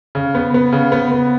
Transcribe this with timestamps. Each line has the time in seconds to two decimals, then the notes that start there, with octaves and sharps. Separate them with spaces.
0.15 C#3
0.35 B3
0.54 B3
0.73 C#3
0.92 B3
1.12 B3